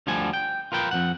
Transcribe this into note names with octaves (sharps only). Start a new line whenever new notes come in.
D2 D3 F3 G3 G#5
G5
F4 A#4 B4 G5
F2 G#2 F#5